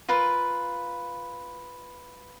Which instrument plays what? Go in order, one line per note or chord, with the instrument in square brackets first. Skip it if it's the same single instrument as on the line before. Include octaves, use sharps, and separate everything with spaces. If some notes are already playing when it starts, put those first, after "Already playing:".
[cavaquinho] F4 A#4 B4